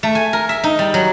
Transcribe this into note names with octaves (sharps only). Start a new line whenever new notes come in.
A3
G#5
A#4
E5
D#4
G3
F#3